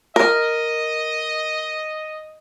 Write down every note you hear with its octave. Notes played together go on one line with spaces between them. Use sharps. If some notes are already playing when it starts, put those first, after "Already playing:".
A#4 D#5